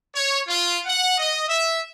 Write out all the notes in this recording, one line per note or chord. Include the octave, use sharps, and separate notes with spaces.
C#5
F4
F#5
D#5
E5